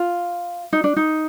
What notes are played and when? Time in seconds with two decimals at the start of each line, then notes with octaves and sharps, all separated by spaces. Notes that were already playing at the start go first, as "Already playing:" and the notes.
Already playing: F4
0.73 D#4
0.84 D4
0.96 D#4